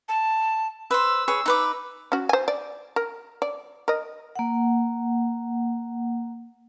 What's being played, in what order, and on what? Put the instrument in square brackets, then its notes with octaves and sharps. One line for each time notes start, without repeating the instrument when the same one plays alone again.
[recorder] A5
[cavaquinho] B4 C5 [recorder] E6
[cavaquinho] G#4 B4 C#5
D#4 B4 D6
[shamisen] C#4 F#4
C5 G#5
D5
A#4
D5
A#4 D#5
[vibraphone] A#3 F#5